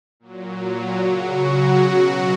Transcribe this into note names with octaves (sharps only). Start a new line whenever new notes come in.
A#2 F#3
C#3 F#3 F#4
B2 F#3